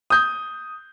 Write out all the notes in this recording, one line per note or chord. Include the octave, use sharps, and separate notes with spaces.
D#6 G6